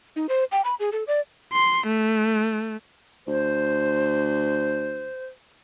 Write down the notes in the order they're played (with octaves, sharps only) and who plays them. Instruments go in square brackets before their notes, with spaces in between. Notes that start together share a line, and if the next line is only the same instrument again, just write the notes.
[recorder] D#4
C5
G5
B5
G#4
A4
D5
[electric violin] C6
A3
[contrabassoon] D2 [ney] C5